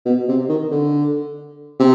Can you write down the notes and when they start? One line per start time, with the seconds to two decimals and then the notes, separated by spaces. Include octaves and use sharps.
0.06 B2
0.28 C3
0.49 D#3
0.71 D3
1.80 C3